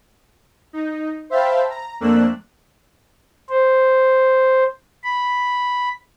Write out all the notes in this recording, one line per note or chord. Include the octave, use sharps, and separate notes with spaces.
D#4
C5 E5 F5 G5 A5 B5
A#5
F2 A3 A#3 D4 E6 F#6
C5
B5